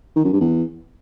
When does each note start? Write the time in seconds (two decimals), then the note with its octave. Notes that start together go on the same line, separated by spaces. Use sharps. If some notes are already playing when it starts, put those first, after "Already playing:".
0.16 D#3
0.25 F#2
0.33 G2
0.41 E2